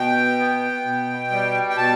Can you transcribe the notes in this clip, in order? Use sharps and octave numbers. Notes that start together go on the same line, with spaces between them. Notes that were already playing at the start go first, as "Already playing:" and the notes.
Already playing: B2 G5
B3
B2
G3
G5
B2 A5